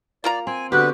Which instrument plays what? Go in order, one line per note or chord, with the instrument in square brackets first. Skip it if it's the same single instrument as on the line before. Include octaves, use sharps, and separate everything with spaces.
[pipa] A#3 F4 A#5 [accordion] D5
[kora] C4 [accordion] G#5
[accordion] D3 B3 B4 [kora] F#4 G4 [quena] F#6